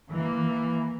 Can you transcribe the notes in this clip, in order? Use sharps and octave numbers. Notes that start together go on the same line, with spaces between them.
E3 A#3
E3